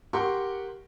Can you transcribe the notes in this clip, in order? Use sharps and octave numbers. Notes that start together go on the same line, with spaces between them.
G4 A#4 F#5 C6 C#6